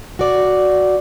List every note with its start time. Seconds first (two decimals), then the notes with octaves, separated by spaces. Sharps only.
0.19 F#4 D5